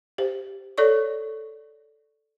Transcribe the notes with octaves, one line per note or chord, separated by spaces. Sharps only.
G4 C5
A4 C#5 D5 C#6